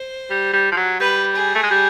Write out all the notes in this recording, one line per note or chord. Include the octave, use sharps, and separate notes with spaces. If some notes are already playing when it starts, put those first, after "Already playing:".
Already playing: C5
G3
G3
F3
F#3
G3 B4
G#4
A3
G#3
G3